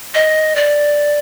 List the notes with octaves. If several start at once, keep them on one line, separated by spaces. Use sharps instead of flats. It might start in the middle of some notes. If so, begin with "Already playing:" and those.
D#5
D5